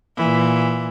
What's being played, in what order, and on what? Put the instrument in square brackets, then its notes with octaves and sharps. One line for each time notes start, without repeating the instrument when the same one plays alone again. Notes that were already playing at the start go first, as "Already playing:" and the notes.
[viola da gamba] A#2 E3